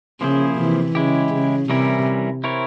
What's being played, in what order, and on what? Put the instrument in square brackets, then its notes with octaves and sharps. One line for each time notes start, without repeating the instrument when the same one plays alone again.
[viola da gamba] C#3 [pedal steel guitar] F3 A#3 E4 G#4 C5
[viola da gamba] C3 E3
[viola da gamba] C#3 [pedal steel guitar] G#3 E4 G4
[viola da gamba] C#3
[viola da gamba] C3 [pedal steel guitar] E3 G3 C#4 E4 A#4
[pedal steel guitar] C4 E4 A#4 C#5